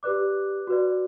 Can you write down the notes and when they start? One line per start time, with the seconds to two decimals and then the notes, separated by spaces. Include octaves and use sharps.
0.03 G4 B4 D5 D6 F#6
0.67 F#4 B4 D5